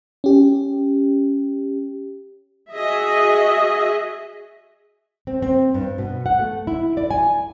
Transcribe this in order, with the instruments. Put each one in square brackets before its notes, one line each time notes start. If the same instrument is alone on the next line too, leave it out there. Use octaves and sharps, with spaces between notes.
[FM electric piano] C#4 G4
[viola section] F#4 G#4 D#5 E5
[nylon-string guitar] C4
C4
G2
B2
F#5
A3
E4
D5
G#5